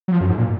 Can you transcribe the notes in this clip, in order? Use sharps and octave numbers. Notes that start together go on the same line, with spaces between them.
F#3
F3
F#2
G#2
A#2